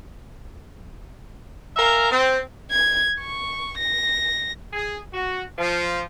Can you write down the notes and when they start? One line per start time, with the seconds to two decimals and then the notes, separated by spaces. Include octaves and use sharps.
1.77 A#4 E5 F5 G#5 A#5
2.11 C4
2.71 G#6
3.20 C#6
3.78 A#6
4.73 G#4
5.13 F#4
5.58 F3